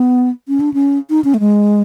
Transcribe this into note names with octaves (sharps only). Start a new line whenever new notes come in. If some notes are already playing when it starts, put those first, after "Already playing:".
Already playing: B3
C#4
D4
C#4
D#4
C#4
A3
G#3